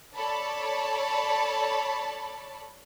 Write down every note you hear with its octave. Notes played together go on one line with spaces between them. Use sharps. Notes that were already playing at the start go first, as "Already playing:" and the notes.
A4 C#5 D5 A5 B5